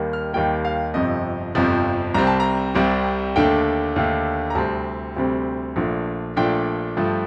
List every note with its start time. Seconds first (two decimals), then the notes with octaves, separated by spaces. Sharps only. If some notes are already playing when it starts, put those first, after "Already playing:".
Already playing: D#2 D#3 G3 A#3
0.13 F6
0.33 D#2 D#3 G3 A#3 G5
0.65 F5
0.94 G1 F2 C3 F3 D#5
1.55 G1 F2 C3 F3
2.14 C2 C3 G3 C4 A#5
2.27 A5
2.40 A#5
2.75 C2 C3 G3 C4
3.36 D#2 D3 A3 D4 G5
3.96 D#2 D3 A3 D4
4.50 A#5
4.55 D2 C3 G3 C4 A5
5.16 D2 C3 G3 C4
5.76 A#1 A#2 A3 D4
6.36 A#1 A#2 A3 D4 G5
6.97 G2 F3 A3